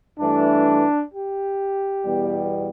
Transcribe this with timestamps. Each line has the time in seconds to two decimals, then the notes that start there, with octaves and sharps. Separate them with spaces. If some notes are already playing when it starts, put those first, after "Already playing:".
0.19 G2 E3 A3 D4
1.11 G4
2.03 E2 B2 G3